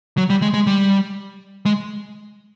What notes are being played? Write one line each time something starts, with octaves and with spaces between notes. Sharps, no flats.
F#3
G3
G#3
G#3
G3
G#3